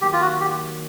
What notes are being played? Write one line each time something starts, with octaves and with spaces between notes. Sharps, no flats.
D#3 F#3 A#3 G4
F4
F#4
G4